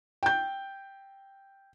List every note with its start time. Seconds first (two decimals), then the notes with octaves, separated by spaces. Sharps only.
0.23 G5 G6